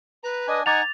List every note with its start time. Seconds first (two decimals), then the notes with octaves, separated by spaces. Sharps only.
0.24 B4 A#5
0.47 D4 D#5 G#5
0.66 D#4 F#5 G#5 A#5 D6 G#6 A6 F7